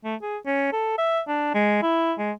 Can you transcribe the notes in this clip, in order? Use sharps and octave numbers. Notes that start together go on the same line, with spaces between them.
A3
G#4
C#4
A4
E5
D4
G#3
E4
G#3